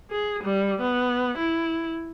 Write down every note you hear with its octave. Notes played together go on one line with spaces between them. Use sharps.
G#4
G3
B3
E4